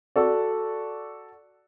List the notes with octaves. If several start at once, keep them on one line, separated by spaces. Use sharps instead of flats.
F#4 A4 D5